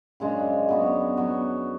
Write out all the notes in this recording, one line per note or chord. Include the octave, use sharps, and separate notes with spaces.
F#2 C#3 G#3 D4
F#3 B3 F#4
F#3 B3 F#4